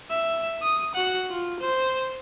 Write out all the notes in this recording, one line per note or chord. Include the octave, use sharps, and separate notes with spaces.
E5
D#6
F#4 F#5
F4
C5